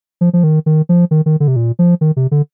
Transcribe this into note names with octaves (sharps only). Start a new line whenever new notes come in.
F3
F3
D#3
D#3
F3
D#3
D#3
D3
C3
A#2
F3
D#3
C3
D3